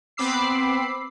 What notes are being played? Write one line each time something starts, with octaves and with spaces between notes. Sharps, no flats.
B3 C4 B5 D6 E6 C7